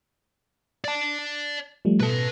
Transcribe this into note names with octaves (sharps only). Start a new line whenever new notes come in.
D5 A5
F3 G3 A3
B2 A4 B4 A5